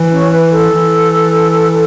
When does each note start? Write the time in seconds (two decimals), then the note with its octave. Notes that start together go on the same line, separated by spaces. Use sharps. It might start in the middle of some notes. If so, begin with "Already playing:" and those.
Already playing: E3
0.12 C#4
0.32 B4
0.52 A4
0.72 E3